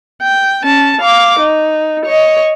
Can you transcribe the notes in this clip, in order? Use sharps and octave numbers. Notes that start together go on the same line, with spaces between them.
G5
C#4 A5
F5 D6
D#4
C#5 D#5